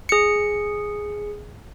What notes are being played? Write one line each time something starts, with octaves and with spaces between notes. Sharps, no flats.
G#4 C#7